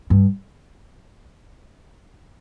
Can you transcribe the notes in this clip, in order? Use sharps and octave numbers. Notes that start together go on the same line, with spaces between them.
G2